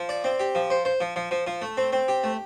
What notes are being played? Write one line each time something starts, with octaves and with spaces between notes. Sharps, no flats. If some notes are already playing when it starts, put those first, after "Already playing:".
Already playing: F3
D5
C4
G4
F3
C5
C5
F3
F3
F3
F3
A3
C4
C4
G4
A3